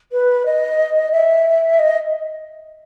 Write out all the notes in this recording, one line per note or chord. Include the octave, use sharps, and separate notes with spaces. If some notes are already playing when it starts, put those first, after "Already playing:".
B4
D#5
E5
D#5